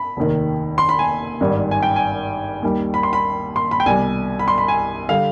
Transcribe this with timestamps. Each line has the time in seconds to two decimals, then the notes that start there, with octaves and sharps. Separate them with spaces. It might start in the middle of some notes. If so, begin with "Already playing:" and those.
Already playing: B5
0.17 F1 D#2 D#3
0.78 C6
0.89 B5
0.99 G#5
1.41 G#1 G2 D#3 G3
1.71 G#5
1.83 G5
1.96 G#5
2.62 D#2 D#3 G3
2.94 B5
3.03 C6
3.13 B5
3.56 C6
3.71 B5
3.80 G5
3.86 C2 B2 G3 G#5
4.39 B5
4.48 C6
4.58 B5
4.68 G#5
5.09 D3 G3 F5